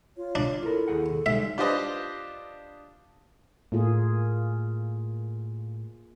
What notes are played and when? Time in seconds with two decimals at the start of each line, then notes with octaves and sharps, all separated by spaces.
0.17 F4 C#5
0.35 D4
0.63 E4 F4 A4 A#4
0.88 D#2 G#4 F#5
1.26 G3 G#3 D#4 E5
1.58 D4 F4 G4 B4 C5 D#5
3.72 A2 A#3 F4 G#4